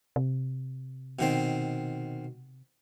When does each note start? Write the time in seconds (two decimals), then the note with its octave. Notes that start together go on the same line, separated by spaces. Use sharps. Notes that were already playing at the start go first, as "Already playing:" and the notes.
0.16 C3
1.19 B2 D#3 C4